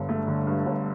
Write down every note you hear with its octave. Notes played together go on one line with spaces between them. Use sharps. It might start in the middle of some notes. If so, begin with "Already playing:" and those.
Already playing: G1 G2 D3
A3
D3
G2
G1